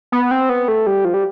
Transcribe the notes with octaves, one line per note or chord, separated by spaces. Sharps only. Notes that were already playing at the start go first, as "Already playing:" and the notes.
B3
C4
B3
A3
G3
F3
G3